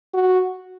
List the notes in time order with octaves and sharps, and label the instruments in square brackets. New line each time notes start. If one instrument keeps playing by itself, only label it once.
[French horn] F#4